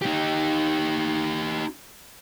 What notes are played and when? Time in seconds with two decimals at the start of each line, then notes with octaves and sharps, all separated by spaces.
0.02 D#4 G4